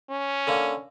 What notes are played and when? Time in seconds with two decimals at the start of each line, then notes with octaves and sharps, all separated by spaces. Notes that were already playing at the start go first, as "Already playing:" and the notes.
0.10 C#4
0.47 D3 A#3